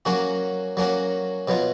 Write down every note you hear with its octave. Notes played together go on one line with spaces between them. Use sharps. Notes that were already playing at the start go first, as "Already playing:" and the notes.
F#3 A#3 C#4 F#4
F#3 A#3 C#4 F#4
B2 F#3 B3 F4